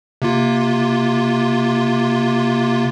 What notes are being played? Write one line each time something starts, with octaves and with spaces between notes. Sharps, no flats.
C3 A#3 F4